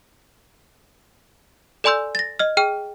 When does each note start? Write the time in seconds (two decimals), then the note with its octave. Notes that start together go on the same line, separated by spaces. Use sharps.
1.84 A4 D5 G#5 C6 E6 G6
2.15 A6 A#6
2.39 D#5 F6
2.57 G#4 G5 F6